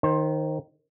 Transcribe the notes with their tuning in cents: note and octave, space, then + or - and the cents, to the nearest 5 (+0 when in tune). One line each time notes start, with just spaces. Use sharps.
D#3 +0 C5 +25